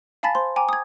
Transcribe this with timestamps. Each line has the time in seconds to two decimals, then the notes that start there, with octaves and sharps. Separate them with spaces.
0.23 F5 G#5 A5 B5 A6 B6
0.35 C5 C6
0.56 G5 G#5 A#5 D6
0.69 D#6 G#6